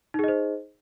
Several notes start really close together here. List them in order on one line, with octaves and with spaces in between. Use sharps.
D#4 G#4 D#5 C5